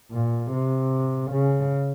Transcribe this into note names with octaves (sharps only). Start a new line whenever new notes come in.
A#2
C3
C#3